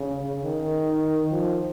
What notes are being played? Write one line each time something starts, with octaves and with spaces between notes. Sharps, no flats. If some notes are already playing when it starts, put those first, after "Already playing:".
Already playing: C#3
D#3
F3